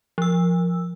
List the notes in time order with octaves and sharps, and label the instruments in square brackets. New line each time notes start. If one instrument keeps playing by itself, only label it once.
[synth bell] F3 E6